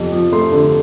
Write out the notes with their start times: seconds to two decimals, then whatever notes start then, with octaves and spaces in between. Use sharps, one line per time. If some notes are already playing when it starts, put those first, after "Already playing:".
Already playing: F2 C3
0.12 F3
0.32 A3 C6
0.52 D3